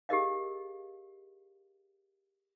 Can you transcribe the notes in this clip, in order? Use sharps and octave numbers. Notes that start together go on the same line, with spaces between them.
G4 G#4 A#4 D#5 F5